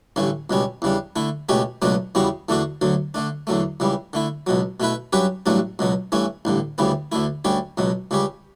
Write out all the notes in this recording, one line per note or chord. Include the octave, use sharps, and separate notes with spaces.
A1 G2 D3 A3 C#4
C#2 B2 G3 C#4
E2 C#3 G3 D4
D3 A3 E4
C#2 B2 A3 C#4 G4
C#2 B2 F#3 A3 D4
E2 C#3 G3 B3 F#4
E2 D3 A3 D4 F#4
D2 D3 F#3
D3 A3 D4
E2 D3 F#3 A3
C#2 C#3 E3 G3
D3 A3 E4
C#2 B2 F#3
B2 A3 E4 B4
G2 F#3 C#4 G4 B4
A1 G2 F#3 A3 D4
C#2 B2 F#3
G2 E3 A3 C#4
A1 G2 D3
D2 C#3 E3 G3 B3
D2 D3 A3 E4
D2 D3 G3 C#4 G4
C#2 B2 F#3
C#2 C#3 G3 C#4 G4